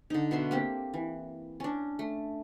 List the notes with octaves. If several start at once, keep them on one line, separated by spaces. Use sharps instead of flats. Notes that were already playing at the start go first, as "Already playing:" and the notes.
D3 D#4
B2 E5 C6
A#3 C4 G4
E3
C#4 D4
A3